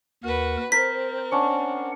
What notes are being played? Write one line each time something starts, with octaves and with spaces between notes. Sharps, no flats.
D#2 F#4 A#4 B4
C4 A#4 C5 B6
C#4 D4 F#5